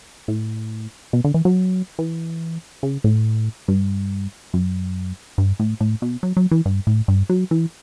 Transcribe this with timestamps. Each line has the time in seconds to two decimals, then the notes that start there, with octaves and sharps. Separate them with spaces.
0.28 A2
1.13 B2
1.24 D3
1.34 E3
1.45 F#3
1.99 E3
2.83 C#3
3.04 A2
3.68 G2
4.54 F#2
5.38 G2
5.59 A2
5.81 A2
6.02 B2
6.23 F#3
6.37 F#3
6.51 E3
6.65 G2
6.87 A2
7.08 G2
7.29 F#3
7.51 E3